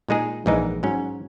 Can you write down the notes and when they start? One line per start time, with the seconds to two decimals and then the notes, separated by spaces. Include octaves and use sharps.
0.09 A#2 G#3 D#4 G#4
0.46 A#1 G#2 E3 G#3 D#4
0.83 G#2 F#3 C#4